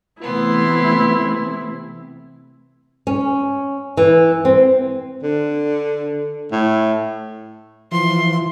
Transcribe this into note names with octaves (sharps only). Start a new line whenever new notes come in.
C3 E3 A3 B3 C4 E4 C6
C#4
E3
C4
D3
A2
E3 F3 C6